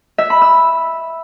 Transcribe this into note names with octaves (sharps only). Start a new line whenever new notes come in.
E5
B5
E6